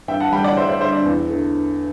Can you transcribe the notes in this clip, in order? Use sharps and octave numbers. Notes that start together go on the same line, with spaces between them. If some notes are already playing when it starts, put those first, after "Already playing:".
G2 E5 G5
F#5 A5
D3 G3 G5 B5
D5 F#5
G2 C5 E5
C5 E5
D3 G3 C5 E5
D5
E2
D3 A3